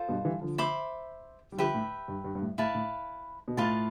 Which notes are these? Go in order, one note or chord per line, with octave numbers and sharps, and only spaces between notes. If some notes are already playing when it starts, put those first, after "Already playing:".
Already playing: F4 A4 C5
G2 B2
E3 G3
D3 F3
C5 E5 B5 D6
G3
D3 F3 G4 B4 E5 G5
A2
G2
G2
G2
A2
A2 E4 B4 F5 A5
A2
B2
A2 F4 B4 F5 A5